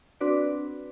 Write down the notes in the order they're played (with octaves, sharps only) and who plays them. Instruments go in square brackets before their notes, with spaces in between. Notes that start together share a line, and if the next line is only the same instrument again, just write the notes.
[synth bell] C4 D4 F#4 B4 D5